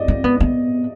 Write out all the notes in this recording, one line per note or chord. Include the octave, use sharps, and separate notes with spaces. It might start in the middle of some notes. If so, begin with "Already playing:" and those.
Already playing: D5 D#5
C4
B3
B3